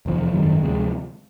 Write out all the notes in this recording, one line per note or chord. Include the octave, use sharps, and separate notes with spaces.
F1 E2 C3 F3
G#1 F#2 D#3 G3
D2 C3 F3 G#3